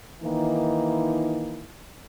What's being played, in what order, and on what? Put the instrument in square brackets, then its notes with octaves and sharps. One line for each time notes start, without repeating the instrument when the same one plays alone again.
[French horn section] D#3 E3 A#3 D#4 E4